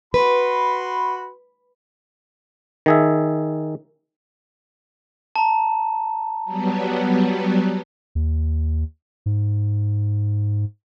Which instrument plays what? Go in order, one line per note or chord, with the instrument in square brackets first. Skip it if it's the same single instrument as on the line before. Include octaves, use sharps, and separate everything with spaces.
[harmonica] F#4 B5 C6 [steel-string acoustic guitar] B4
[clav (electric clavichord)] D#3 G#4 E5
[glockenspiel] A5 A#5
[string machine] F#3 G3 B3
[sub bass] D#2
G#2